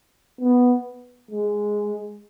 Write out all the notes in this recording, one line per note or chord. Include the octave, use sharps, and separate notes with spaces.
B3
G#3